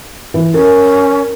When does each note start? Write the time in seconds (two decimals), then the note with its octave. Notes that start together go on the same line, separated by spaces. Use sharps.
0.34 E3
0.54 C#4 A#4